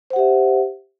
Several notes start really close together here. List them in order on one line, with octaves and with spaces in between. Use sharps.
C5 F#5 G4 E5